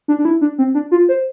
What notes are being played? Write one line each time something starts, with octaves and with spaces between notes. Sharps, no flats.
D4
D4
E4
D4
C4
D4
F4
C5